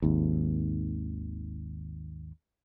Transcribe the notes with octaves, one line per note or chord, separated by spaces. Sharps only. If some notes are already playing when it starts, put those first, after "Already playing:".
G#1 D#2